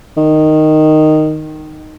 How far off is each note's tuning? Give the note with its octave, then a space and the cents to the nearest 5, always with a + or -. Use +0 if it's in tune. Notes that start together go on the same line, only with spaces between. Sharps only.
D#3 -5